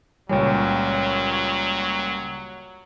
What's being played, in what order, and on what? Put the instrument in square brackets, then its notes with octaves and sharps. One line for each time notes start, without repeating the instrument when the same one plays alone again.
[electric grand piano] C#2 A#2 G3 [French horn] F#3 [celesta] C#5 G#5